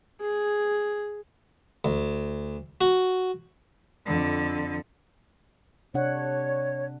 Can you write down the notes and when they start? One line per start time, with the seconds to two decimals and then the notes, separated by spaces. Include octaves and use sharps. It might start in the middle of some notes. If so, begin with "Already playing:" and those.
0.21 G#4
1.85 D2
2.81 F#4
4.06 F2 D3
5.94 C3 D4 C#5 F#5